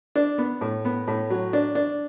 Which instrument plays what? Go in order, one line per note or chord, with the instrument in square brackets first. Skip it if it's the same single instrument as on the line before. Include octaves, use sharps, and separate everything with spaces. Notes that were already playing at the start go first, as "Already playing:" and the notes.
[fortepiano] D4
B3
A2
B3
A2
F#3
D4
D4